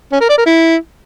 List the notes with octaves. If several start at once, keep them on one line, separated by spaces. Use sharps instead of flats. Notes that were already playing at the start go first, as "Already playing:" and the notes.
C#4
A#4
D5
A#4
E4